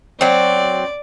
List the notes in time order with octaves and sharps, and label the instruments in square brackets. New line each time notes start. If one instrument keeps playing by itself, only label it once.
[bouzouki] F#3 C4 [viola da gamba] D5